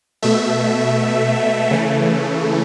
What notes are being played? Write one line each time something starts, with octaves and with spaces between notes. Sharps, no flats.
B2 A3 E5
C#3 E3 A3